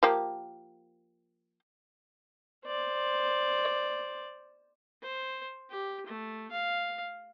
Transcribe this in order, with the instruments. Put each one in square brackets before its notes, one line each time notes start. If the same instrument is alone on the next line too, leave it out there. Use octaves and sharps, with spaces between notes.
[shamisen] F3 A#3 G4
[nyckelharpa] C5 D5
C5
G4
A3
F5